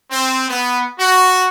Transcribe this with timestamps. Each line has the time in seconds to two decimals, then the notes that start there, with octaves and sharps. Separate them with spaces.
0.11 C4
0.48 B3
0.99 F#4